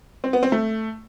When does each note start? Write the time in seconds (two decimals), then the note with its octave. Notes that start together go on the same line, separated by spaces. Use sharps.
0.24 C4
0.33 B3
0.43 C4
0.52 A3